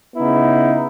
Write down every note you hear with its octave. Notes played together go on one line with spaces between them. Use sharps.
C#3 B3 D#4 E4